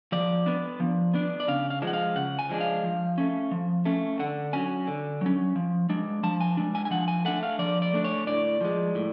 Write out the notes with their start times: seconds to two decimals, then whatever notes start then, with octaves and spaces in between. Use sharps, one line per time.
0.12 F3 D5
0.46 B3 D4
0.80 F3
1.14 B3 D4
1.40 D5
1.48 C#3 F5
1.70 F5
1.82 F3 G#3 D4
1.87 F#5
1.93 F5
2.16 C#3 F#5
2.39 G#5
2.49 F3 G#3 D4
2.61 F5
2.84 F3
3.18 A3 C#4
3.51 F3
3.85 A3 C#4
4.19 D3 F#5
4.53 F#3 C#4 G#5
4.87 D3
5.21 F#3 C#4
5.56 F3
5.89 G#3 D4
6.23 F3 A5
6.40 G#5
6.57 G#3 D4
6.75 G#5
6.85 G#5
6.91 F3 F#5
7.08 G#5
7.25 A3 D4 F#5
7.43 F5
7.59 F3 D5
7.82 D5
7.93 A3 D4
8.04 C#5
8.27 A2 D5
8.61 F3 G#3
8.95 A2